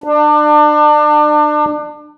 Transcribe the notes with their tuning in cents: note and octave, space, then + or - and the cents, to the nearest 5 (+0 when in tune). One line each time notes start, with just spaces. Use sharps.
D4 +30